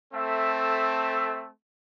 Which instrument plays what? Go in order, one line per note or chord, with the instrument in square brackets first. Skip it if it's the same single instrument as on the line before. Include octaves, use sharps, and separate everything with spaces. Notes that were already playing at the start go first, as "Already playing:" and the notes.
[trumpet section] A3 C4 A4 E5